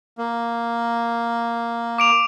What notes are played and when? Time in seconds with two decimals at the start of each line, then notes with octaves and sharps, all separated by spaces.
0.18 A#3
1.98 D6 D7 F7